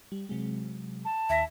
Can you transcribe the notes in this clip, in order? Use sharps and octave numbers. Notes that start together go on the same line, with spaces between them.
G3
C3 F#3 G#3
A5
D#2 E5 A#6